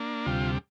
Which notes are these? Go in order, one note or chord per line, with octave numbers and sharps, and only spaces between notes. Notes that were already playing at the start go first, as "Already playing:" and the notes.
Already playing: A#3 D4
D2 C3 G3 F4